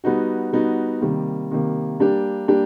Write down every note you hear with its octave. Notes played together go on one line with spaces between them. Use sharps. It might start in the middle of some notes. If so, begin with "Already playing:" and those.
G3 B3 D#4 F#4
G3 B3 D#4 F#4
C3 D#3 G3 A#3
C3 D#3 G3 A#3
G3 A#3 D4 G4
G3 A#3 D4 G4